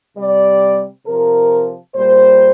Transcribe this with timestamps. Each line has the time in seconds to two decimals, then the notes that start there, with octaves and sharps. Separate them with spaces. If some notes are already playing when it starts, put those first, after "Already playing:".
0.17 C3 G3 D5
1.06 C3 F3 A#4
1.95 A#2 G3 C5